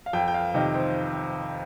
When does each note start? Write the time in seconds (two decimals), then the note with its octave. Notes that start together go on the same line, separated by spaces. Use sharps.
0.06 F5
0.13 F2 G5
0.28 G5
0.34 F5
0.54 C3 D#3 D#5
0.75 C5